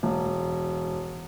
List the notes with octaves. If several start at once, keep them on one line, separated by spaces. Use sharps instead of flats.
E1